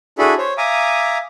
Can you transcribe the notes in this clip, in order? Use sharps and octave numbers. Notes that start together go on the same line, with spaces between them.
D4 E4 F#4 G#4 A4 B5
C5 C#5
E5 F5 G#5 A#5 D6 D#6